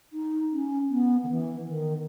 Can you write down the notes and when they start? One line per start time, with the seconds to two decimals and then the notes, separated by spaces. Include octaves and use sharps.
0.13 D#4
0.52 C#4
0.89 B3
1.23 D#3
1.29 E3
1.66 D#3